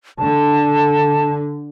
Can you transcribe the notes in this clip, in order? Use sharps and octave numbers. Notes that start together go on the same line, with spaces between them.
D3 A5